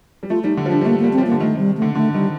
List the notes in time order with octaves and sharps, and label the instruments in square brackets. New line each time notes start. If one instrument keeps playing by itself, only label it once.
[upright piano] G3
[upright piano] A3 [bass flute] F4
[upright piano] G3 [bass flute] D#4
[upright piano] D3
F3
[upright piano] G3 [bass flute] D4
[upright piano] G3
[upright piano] A3 [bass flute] A#3
[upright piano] G3 [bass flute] A#3
[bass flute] C4
[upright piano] G3
[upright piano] F3 [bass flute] A#3
[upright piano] D3
[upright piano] D#3 [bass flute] A3
[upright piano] C3 [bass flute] G3
[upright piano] D3 [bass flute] A3
[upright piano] D3 [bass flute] A3
[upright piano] D#3 [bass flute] G3